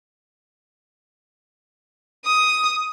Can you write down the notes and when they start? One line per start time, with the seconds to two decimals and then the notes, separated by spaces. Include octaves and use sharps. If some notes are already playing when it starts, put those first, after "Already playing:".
2.26 D#6